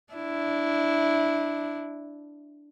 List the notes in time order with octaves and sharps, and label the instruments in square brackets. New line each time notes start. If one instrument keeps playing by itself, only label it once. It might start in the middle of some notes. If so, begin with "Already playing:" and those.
[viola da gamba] D4 E4